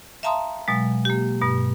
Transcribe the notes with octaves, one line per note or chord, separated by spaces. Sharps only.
E5 F5 A5 A#5 C6 D#6
B2 F#3 G#3
A#3 G4
G2 B2